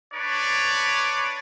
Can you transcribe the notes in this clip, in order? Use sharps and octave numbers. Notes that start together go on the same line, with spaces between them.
D4 B4 C#5 D5